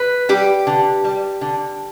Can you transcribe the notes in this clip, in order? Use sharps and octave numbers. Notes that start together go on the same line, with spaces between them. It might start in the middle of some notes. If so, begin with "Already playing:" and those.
Already playing: B4
G3 G4
D3
G3
D3